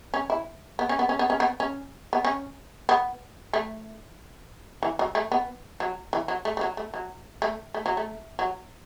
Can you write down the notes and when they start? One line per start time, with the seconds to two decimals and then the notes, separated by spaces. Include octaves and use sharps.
0.14 C#4
0.30 E4
0.79 B3
0.89 C#4
0.99 B3
1.09 C#4
1.19 B3
1.30 C#4
1.40 B3
1.60 C#4
2.13 B3
2.25 C#4
2.89 B3
3.53 A3
4.83 E3
4.99 F#3
5.15 A3
5.32 B3
5.80 F#3
6.13 E3
6.28 F#3
6.45 A3
6.57 A3
6.61 F#3
6.77 A3
6.94 F#3
7.42 A3
7.74 A3
7.86 F#3
7.97 A3
8.39 F#3